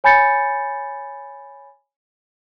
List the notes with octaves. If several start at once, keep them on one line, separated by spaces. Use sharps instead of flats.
C#5 G#5 B5 G6 A6 C#7